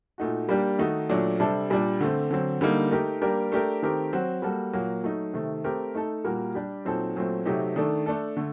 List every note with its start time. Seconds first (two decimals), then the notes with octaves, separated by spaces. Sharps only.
0.18 A#2 A3 D#4 F#4
0.49 G3 A#3 D4 G4
0.79 D#3 A3 D#4 F#4
1.09 A#2 F#3 A3 D4
1.40 C3 G3 D4 A4
1.70 A#2 G3 D4
2.00 D3 A3 C4
2.31 D3 F#3 C4
2.61 D3 G3 A#3 D#4
2.91 A3 D#4 G4 A#4
3.22 G3 A#3 D4 G4 A#4
3.52 A3 D4 G4 A#4
3.82 D#3 A3 C4 G4 A#4
4.13 F#3 C4 F#4
4.42 G3 A#3 F#4 A4
4.73 A#2 F#3 A#3 F#4
5.03 F#3 A3 D#4
5.33 C3 D#3 A3
5.64 A3 C4 G4 A#4
5.95 A3 D#4 A4
6.24 A#2 G3 A#3 F#4 A#4
6.55 G3 D4 G4
6.85 A#2 F#3 C4 D#4 A4
7.16 A#2 F#3 A3 C4
7.46 C3 F#3 A3 D#4 G4
7.76 D#3 A3 D4 A4
8.06 A3 D4 A4
8.37 D3 A3